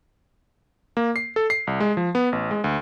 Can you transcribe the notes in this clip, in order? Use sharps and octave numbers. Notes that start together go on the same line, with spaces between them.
A#3
C7
A4
C7
C2
G#3
F3
B3
A1
G#3
D2